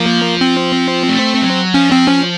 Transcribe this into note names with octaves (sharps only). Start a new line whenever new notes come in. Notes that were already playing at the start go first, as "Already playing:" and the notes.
Already playing: F3 A#3
C4
A3
F#3
F3 C#4
C4
C#4